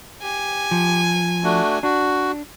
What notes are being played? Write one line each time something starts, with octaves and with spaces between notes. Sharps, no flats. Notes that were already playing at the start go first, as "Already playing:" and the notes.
G4 G#5
F3
A3 D4 F#4
D4 F#4